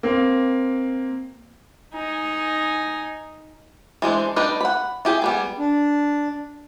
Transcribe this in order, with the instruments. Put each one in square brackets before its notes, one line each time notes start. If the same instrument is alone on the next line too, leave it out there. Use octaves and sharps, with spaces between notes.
[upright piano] A#3 C4
[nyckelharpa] D#4 G#5
[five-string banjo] E3 G#3 D4 C5
G3 D4 D#4 B4
F#5 B5
E4 G4 G#4
G3 B3 G#4
[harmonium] D4